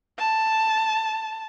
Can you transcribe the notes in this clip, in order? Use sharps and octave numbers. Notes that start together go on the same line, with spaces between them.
A5